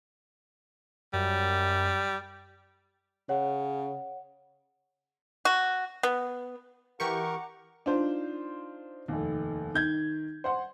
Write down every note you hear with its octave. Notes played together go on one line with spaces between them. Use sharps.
F#2 G3
C#3 C#5 F#5
F#4
B3
E3 G4 A#4 F#5 A#5 C#6 D6
D4 D#4 F4 C5
F1 D#2
D#3 G6 G#6
C5 F#5 C6